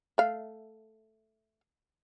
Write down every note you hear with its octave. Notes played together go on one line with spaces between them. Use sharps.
A3 F5